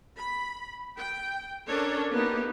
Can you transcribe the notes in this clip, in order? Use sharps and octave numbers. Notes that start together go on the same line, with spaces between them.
B5
G5
C#4 D4 A4 A#4 C#5
A#3 B3 D#4 G4